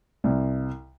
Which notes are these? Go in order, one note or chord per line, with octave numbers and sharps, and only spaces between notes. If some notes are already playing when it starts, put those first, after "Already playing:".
C2